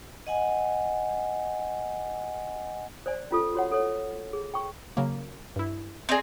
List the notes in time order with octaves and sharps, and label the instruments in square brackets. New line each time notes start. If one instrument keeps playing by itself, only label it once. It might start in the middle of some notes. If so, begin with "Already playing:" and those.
[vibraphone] D#5 F#5 G#5
[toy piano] C5 D5 G#5
C#4 F4 A4
F#4 C#5 F#5
A4 C#5
G#4
G5 C#6
[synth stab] C#3 F#3 A#3
G2 E4
[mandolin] C4 G#4 [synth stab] D5 D#5 A#5